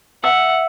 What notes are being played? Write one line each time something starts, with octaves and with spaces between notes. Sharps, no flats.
E5 F#5